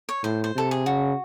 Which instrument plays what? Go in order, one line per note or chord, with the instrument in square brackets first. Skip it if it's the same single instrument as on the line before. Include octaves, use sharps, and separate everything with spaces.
[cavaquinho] C#5
[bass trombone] A2 [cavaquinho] C5
[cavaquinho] C5
[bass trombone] C3 [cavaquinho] A4
[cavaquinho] G#4
[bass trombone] C#3 [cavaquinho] F#4